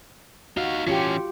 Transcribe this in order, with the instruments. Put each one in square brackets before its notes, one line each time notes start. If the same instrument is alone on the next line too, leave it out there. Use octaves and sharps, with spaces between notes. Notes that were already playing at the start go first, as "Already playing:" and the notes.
[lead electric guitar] D#4 F5 [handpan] F#4
[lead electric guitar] E3 C#4 [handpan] F4 G4